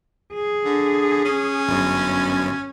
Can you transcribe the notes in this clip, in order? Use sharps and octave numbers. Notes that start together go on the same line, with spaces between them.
G#4
D3
C#4
G1 F#2